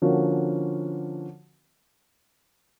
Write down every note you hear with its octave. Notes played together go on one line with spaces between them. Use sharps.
D3 F3 A#3 C#4 F#4